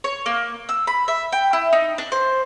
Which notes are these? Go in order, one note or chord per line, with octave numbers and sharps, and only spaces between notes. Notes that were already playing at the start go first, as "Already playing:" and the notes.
C#5
A#3
E6
B5
E5
G5
E4
D#4
D4
C5